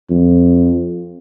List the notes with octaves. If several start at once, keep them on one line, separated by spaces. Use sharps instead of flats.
F2